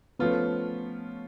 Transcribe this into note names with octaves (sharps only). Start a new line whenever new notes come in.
F3 A3 B3 C#4 F4